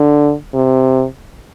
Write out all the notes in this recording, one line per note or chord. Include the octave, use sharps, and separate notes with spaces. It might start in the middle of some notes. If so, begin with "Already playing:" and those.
Already playing: D3
C3